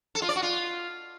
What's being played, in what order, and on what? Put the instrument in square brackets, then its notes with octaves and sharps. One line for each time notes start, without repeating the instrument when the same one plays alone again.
[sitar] A4
F4
D5
F#4
F4